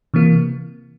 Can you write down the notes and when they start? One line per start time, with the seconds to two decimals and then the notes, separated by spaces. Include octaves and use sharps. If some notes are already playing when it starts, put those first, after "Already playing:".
0.14 C3 E3 A#3